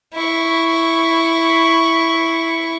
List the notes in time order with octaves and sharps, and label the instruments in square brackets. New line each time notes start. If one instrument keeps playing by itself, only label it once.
[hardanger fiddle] E4 C#6